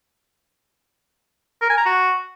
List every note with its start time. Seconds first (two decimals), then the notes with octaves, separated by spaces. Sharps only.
1.62 A#4
1.70 G#5
1.78 A#5
1.86 F#4